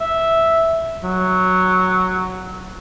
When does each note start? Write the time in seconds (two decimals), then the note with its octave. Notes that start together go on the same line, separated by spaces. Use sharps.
0.01 E5
1.03 F#3